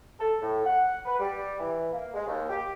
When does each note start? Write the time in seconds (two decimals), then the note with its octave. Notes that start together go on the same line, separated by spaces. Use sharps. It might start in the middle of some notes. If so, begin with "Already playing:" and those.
0.20 A4
0.42 A2
0.66 F#5
1.06 B4
1.19 G3
1.60 E3
1.92 A#3
2.14 G#3
2.27 D#2
2.49 G4